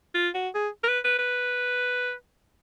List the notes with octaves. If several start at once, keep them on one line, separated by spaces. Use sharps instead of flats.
F4
F#4
G#4
A#4
B4
B4
B4